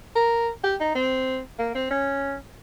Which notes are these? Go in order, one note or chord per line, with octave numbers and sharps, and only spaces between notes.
A#4
G4
D#4
C4
A#3
C4
C#4